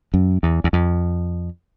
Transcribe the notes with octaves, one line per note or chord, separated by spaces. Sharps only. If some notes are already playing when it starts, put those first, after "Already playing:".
F#2
E2
E2
F2